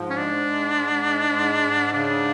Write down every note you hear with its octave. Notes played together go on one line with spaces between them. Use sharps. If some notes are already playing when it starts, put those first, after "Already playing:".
Already playing: G#2 F3
C#4
G#3 D4
G#2
G#2
G#3
G#2
G#2
C#3 D4